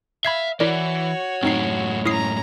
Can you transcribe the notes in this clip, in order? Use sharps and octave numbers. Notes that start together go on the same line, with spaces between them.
E5 F5 B5 G#6 C7
E3 E4 F#4 A#4 C#5 D5
F#2 A2 C4 D#4 C7
C#4 E4 A#5 D#6 C7